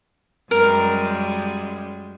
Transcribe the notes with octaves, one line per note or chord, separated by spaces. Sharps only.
F#2 G3 G#3 A#4